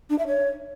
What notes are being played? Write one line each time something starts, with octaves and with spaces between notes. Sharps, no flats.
D4
E5
C#5